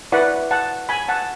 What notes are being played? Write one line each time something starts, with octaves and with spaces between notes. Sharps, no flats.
E4 B4 D5 F#5
F#5 A5
G#5 B5
F#5 A5